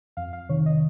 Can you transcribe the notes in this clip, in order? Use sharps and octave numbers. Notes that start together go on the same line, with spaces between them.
F2 F5
F5
C3 D#3 C#5
D#5